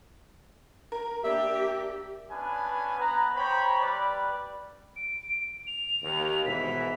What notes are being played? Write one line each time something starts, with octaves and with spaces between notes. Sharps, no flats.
A#4
A#3 D4 G4 E5
B3 C#4 D4 B4 G#5
B3 B4 A#5
C5 C#5 G5 A#5 B5
G3 B4 D5
D7
F7
D#2
G#2 B2 E3 B6